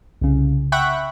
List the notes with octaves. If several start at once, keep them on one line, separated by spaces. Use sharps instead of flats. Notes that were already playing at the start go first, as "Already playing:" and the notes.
C2 C#3
E5 F#5 G5 B5 C#6 F#6